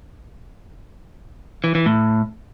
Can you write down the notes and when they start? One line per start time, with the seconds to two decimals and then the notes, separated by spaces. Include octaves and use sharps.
1.64 E3
1.75 E3
1.86 A2